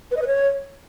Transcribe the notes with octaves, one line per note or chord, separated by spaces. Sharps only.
B4
D#5
B4
C#5